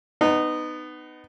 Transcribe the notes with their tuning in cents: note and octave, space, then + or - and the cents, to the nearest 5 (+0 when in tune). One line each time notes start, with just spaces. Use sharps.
B3 +20 D#4 -20